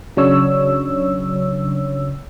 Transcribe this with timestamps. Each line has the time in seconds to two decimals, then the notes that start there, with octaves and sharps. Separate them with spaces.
0.17 C#3 F#3 D4 C#5 E6